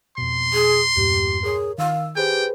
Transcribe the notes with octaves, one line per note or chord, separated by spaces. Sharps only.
F2 B2 C6
G#4
E2 G2 A#2 G4
G#4 A#4 C#5
D#3 F5 E6
G4 G#4 B4 C5 G5